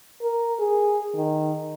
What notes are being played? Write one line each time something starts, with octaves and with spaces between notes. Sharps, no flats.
A#4
G#4
D#3